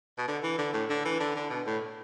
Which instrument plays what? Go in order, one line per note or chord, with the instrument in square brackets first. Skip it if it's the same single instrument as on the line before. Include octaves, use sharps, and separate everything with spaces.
[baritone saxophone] B2
D3
E3
D3
A2
D3
E3
D3
D3
B2
A2